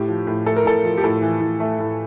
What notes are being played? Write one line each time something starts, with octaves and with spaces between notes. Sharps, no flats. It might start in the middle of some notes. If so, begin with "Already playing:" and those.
Already playing: A2 G4
F3
A2
A3 A4
A#4
A2 A4
F3
G4
A2 A4
E3
A2
A3
A2